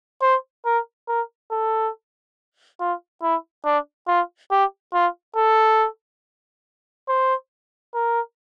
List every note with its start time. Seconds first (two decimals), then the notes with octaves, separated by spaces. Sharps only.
0.22 C5
0.65 A#4
1.08 A#4
1.51 A4
2.80 F4
3.22 E4
3.65 D4
4.08 F4
4.51 G4
4.93 F4
5.36 A4
7.08 C5
7.94 A#4